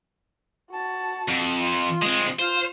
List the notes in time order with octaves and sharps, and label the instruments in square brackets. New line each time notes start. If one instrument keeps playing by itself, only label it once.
[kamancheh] F#4 A5
[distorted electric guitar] F2
[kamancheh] F4 C6
[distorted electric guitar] G#3 C4
[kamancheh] F4 F6 [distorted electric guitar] C5